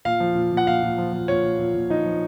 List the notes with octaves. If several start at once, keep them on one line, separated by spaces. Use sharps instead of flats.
A#2 F5
F3
A#2
A#2
F#5
A#2 F5
A#2
F3
F3
A#2 C#5
A#2
A#2
A#2
F3 D#4
F3